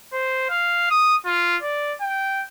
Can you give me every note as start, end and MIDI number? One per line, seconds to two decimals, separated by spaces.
0.13 0.46 72
0.49 0.89 77
0.91 1.15 87
1.26 1.56 65
1.62 1.93 74
2.02 2.43 79